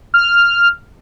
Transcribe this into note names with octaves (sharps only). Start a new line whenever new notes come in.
F6